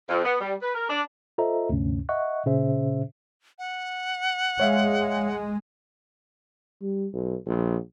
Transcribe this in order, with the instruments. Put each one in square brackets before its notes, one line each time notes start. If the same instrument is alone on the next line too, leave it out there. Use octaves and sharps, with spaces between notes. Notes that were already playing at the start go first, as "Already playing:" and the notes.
[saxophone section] F2
B3
G3
B4
A#4
D4
[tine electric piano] F4 A4 C5 D#5 E5 A#5
D2 G2 C3 C#4
D#5 E5 F#5 C#6 F#6
A#2 C#3 C#4 G#4 C5 E5
[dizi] F#5
[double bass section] G#3 [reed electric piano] C#5 E5 F5
[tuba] G3
B1
A#1